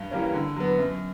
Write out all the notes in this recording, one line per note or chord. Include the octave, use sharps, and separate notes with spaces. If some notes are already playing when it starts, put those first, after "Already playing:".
Already playing: G2
E3 G3 A#3 C#4
D3
F#3 B3
F#2